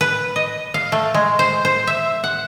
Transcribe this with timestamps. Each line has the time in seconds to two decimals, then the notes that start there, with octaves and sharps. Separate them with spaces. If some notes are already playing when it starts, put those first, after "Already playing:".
0.01 B4
0.36 D#5
0.74 F5
0.92 A3
1.14 G#3
1.39 C5
1.65 C5
1.87 E5
2.24 F#5